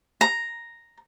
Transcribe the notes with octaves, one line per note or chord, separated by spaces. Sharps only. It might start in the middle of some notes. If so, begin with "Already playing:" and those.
A#5